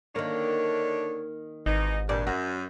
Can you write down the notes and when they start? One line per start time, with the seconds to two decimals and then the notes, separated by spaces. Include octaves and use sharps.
0.16 D3 D#3 A#3 D4 C#5
1.66 G#1 E3 D#4
2.09 G2 A#2 D5
2.27 F#2 F#4